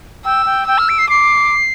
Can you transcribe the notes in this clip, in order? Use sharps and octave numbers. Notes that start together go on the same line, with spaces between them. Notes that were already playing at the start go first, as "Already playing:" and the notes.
G5 E6
G5
G5 E6
F6
D7
C7
D6 C7